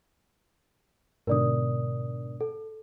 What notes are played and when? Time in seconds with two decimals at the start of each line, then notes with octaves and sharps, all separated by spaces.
1.27 G#2 B2 D3 A#4 D5 D#6
2.41 A4